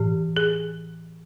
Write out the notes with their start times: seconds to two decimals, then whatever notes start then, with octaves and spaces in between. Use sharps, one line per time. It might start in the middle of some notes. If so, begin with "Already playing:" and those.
Already playing: A2 E3 G4
0.37 G#4